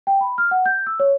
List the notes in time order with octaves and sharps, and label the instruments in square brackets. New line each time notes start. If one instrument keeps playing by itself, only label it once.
[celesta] G5
B5
F6
F#5
G6
E6
C#5